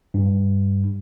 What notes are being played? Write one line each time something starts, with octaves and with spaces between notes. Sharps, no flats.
G2